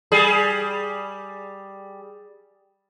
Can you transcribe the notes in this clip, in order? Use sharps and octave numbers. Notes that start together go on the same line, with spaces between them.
G3 G#4